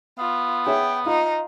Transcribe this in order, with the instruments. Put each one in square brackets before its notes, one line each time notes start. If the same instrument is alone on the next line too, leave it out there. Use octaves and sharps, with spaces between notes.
[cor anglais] B3 [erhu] F4
[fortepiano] G#4 C#5 E5 [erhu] G5
[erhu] D#4 [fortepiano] F4